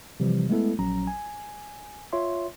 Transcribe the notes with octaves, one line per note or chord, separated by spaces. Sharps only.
C3 E3 F3 G3
G#3 A3 B3 E4 A4
A#1 F#3 C#4 A#5
G#5
F4 C#5 E5 C6